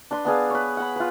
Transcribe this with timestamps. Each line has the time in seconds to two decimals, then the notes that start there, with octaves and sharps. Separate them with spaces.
0.11 D4 B4 C6
0.25 B3 D4 G#4 F5
0.50 B4 C#5
0.77 F#5 B5
0.96 F4 B4